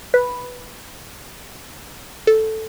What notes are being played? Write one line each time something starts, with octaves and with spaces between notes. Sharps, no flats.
B4
A4